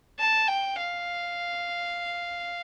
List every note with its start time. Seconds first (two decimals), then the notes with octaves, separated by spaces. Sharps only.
0.19 A5
0.48 G5
0.78 F5